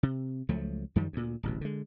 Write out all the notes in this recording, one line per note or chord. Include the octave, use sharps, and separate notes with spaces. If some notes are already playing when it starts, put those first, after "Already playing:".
C3
C#2 F3 F#3 A3
F#2 D#3 F3 G3
D2 A#2
D1 A1 B2
D3 G#3